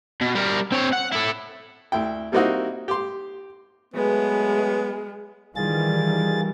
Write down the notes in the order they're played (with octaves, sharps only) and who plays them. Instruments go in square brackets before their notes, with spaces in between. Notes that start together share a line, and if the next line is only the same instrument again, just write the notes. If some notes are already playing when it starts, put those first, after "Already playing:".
[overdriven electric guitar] B2
G3 A#4
C4 C#5
F#5
E4 A4
[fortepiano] D2 E4 G5
G3 A#3 C4 D#4 E4 F#4
G4 C6
[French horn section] F#3 A3 B4 [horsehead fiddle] G#3 [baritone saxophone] B3
[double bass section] D#3 E3 G3 [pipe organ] F4 G#4 A6